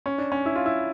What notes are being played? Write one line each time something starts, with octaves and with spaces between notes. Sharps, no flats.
C#4
D4
C#4
E4
F4
E4